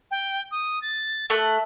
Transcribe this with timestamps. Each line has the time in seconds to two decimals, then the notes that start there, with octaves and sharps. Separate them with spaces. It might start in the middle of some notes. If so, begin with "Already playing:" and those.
0.10 G5
0.51 D#6
0.81 A6
1.30 A3 F#6